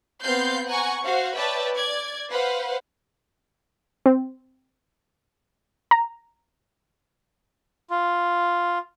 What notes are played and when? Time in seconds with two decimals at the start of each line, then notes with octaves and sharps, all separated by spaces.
0.22 B3 C4 F5 C6 G6 C7
0.67 F#5 G#5 A#5 C#6
1.04 F#4 C5 F5 F#5
1.35 B4 C#5 D5 E5 G5 A5
1.75 D5 G#6
2.29 B4 C5 F5 F#5
4.06 C4
5.91 A#5
7.90 F4